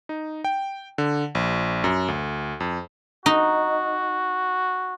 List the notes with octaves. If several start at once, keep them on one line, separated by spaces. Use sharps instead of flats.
D#4
G5
D3
A#1
F#2
D2
F2
D#4 F#4